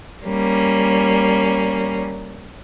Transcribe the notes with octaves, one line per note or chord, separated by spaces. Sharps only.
G3 A#3 C#4